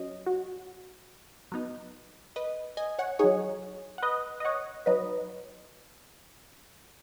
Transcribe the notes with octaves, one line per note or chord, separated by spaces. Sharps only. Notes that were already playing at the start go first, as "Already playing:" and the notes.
Already playing: F#3 C#4 D#5
F#4
F#3 B3 D#4
B4 D#5
D#5 G#5
C#5 F#5
F#3 D#4 G#4 C#5
F#5
B4 D#5
D#5
C#5 F#5
F#3 D#4 B4 D#5